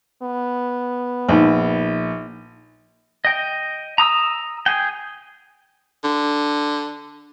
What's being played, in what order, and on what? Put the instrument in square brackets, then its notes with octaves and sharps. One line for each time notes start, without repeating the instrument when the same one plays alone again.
[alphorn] B3
[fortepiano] A#1 [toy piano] D#4 C5
[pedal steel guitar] D#5 G5
A#5 D#6 E6
G#4 G5
[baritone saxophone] D3